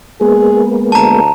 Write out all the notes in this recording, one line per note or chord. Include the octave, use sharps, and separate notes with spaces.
G#3 A#3 B3 G#4
D2 A5 A#5